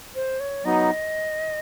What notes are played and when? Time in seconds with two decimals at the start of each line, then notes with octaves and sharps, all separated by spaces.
0.15 C5
0.40 C#5
0.65 F#3 B3 D#4 D#5